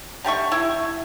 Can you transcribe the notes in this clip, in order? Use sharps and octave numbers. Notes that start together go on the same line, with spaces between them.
D3 G4 E5 C#6
E4